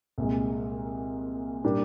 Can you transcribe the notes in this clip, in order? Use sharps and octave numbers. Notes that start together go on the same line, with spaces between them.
C2 A#2 G#3
A#2 G3 D4 G4 A#4